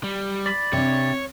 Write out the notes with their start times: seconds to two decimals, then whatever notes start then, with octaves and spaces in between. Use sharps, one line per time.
0.04 G3
0.46 D5 B5
0.73 C3 D4 C#5